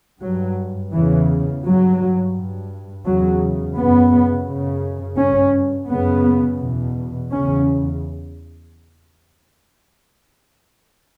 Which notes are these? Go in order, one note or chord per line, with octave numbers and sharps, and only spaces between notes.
G2 F#3
E2 C#3 E3
G2 F#3
G2
E2 C#3 F#3
F#2 C#3 B3
F#2 C#3
G2 C#4
F#2 C#3 B3
E2 B2
E2 C#3 C#4